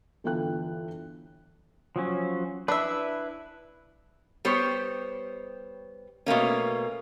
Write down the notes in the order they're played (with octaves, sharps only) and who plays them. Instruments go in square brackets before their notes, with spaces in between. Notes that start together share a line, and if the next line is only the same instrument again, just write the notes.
[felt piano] G1 E3 F4 A4 G5 F#6
[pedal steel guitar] F3 F#3 C#4
[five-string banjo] D4 E5 [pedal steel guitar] E4 B4
[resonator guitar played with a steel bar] G3 B3 G4 C5 C#5
B2 A3 A#3 C#4